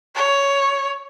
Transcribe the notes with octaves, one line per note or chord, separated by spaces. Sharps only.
C#5